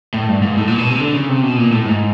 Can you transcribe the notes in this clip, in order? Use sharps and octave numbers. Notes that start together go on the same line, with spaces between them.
A2
G2
G#2
A2
A#2
B2
C3
D3
C#3
C3
B2
A#2
A2
G#2